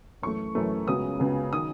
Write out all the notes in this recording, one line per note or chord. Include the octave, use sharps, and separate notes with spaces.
F#2 E3 A3 C#6
F#2 E3 A3
C#2 C#3 F#3 B3 D#6
C#2 C#3 F#3 B3
D#3 F#3 D#6